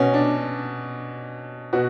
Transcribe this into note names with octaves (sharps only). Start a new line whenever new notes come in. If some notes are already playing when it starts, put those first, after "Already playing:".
Already playing: B2 C#4
D4
B2 F#4